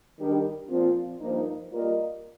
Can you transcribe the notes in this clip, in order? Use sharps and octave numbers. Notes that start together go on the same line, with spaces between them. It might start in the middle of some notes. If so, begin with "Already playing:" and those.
D#3 G3 D4 G4 A#4
A#2 F3 C4 F4
G2 F3 A#3 D#4
G3 A#3 F4 A#4 D#5